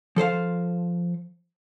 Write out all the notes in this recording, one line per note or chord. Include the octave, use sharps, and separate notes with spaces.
F3 A4 C5 F5